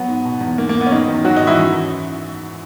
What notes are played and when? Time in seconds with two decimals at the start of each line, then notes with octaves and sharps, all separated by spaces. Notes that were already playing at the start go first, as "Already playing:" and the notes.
Already playing: F#3 B3
0.08 G#2
0.25 B2
0.41 E2
0.58 G#2 A#3
0.69 A#3
0.75 G#2
0.81 B3
0.87 C#4
0.91 D#3 F#3 D#4
1.08 E2
1.25 G#2 F#3 F#4
1.36 D#3 D#4
1.42 G#2
1.47 E3 E4
1.58 F#2